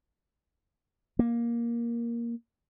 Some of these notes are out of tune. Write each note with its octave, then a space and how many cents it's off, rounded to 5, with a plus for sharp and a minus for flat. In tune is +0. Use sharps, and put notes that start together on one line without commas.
A#3 +10